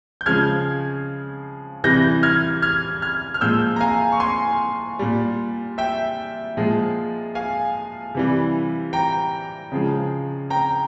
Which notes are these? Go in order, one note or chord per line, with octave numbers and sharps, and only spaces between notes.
G6
C#3 F3 G#3 F6 G#6
C3 E3 G3 G6 A#6
F6 G#6
F6 G#6
F6 G#6
F6
A#2 F3 G#3 E6 G6
A#5
F5 G#5
C#6
G#5 C6
A#2 G3
E5 G5
A#2 F3 G#3
F5 G#5
C3 E3 G3
G5 A#5
C#3 F3 G#3
G5 A#5